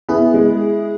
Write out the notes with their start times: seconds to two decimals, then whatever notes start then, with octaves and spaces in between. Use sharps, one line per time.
0.09 B3 E4 G#4
0.34 G#3